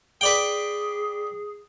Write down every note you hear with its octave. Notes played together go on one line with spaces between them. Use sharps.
G#4 B4 D5 G5